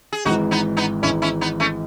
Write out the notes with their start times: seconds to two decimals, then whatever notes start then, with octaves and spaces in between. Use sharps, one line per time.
0.13 G#4
0.25 G#1 G#2 E3 D#4 F#4
0.51 B3 D#4
0.77 B3 D#4
1.02 G#1 G#2 E3 C#4 E4
1.22 C#4 E4
1.41 B3 D#4
1.60 A3 C#4